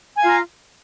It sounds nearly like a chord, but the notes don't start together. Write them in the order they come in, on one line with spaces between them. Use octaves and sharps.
G#5 F5 F4 A#5